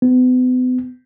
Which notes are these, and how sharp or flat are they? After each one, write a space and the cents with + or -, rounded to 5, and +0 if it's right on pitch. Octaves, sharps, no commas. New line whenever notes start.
B3 +40